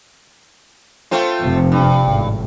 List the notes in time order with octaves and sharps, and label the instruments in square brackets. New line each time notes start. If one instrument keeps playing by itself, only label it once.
[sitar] A3 C4 F4
[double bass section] F1 C3 F3
[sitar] G2
[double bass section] G#1 A2